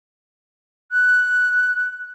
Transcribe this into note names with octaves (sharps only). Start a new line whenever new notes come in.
F#6